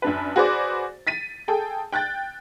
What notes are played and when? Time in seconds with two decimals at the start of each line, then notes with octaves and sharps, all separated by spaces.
0.02 F#2 D4 B4
0.36 F#4 G#4 B4 C5 D5
1.07 A6 B6 D#7
1.48 G#4 A4 G5
1.92 G5 F#6 G6 A6